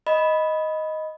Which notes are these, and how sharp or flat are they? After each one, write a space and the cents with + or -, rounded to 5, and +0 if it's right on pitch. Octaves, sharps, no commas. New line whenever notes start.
D#5 +5 B5 +0